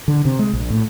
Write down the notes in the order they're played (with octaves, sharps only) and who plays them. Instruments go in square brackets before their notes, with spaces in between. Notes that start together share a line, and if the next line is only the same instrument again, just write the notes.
[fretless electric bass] D3
C3
G#3
A#1
A2